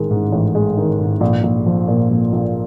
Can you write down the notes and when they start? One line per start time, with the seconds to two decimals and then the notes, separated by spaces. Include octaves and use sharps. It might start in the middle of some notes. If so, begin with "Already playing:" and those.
Already playing: A1 D#3 G#3
0.11 G#2
0.32 A1
0.55 G#3
0.77 D#3
1.00 G#2
1.21 A#1
1.43 A#1
1.66 F3
1.88 A#2
2.11 A#1
2.33 A#1